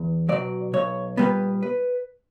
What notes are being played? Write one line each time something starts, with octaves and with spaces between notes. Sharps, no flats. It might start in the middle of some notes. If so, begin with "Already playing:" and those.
Already playing: E2
B2 F#3 D5
B1 C#5
A#2 G3 B3 B4
B4